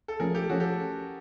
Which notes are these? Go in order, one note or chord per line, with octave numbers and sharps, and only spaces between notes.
A4
F3 A3 C#4 G#4 A#4
G4 A4
F3 A3 C#4 F#4 G#4
G4 A4